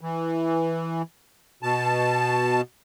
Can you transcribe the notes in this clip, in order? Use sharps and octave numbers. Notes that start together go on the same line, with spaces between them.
E3
B2 A5